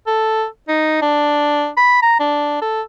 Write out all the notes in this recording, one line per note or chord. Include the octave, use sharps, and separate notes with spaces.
A4
D#4
D4
B5
A#5
D4
A4